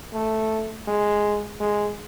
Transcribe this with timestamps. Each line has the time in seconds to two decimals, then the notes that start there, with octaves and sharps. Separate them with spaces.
0.13 A3
0.87 G#3
1.60 G#3